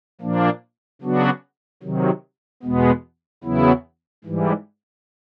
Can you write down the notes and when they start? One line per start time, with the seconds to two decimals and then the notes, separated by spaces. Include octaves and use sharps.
0.21 A#2 F3 A#3 D4
1.02 C#3 F#3 B3 D4 F#4
1.82 C3 D#3 F#3
2.63 E2 B2 G#3 B3
3.44 E2 C#3 F#3 B3 E4
4.24 G#2 E3 G3